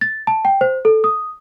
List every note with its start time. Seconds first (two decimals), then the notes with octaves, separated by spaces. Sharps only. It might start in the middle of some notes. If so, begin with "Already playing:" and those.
0.01 A6
0.27 A5
0.45 G5
0.61 C5
0.85 A4
1.04 D#6